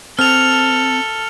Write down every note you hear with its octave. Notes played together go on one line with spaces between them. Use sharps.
C4 A4 F6 F7